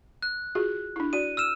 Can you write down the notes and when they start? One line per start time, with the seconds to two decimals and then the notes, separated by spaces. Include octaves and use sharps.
0.22 F#6
0.55 F4 F#4 G#4
0.96 D4 E4
1.13 F#4 D5 D#7
1.37 E6 F6 E7